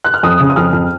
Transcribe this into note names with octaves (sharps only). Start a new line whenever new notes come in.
F#6
F6
F2 D#6
C#3
D#6
F2 F6
F2